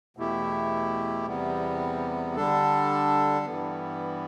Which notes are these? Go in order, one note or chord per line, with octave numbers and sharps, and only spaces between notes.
E2 B2 A3 E4 G4
E2 C3 G3 B3
D3 G3 D4 A4
G2 E3 G3 B3